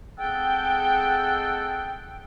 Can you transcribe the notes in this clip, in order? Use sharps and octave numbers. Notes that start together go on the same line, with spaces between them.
G#3 C4 G#4 A4 F#5 G5